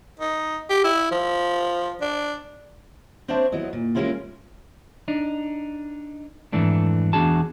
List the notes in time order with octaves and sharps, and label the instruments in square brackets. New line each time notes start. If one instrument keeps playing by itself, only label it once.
[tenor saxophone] D#4
G4
E4
F3
D4
[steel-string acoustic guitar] C4 D4 C5 C#5 E5 A5
F#3 B3 E4 D#5
A#2
G#3 A#3 C4 C#4 E4 F4
[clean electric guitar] D4 D#4
F2 G#2 E3 A3 D4
E2 D4 F#4 G#4 A5